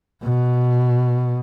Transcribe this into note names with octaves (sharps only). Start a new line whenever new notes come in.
B2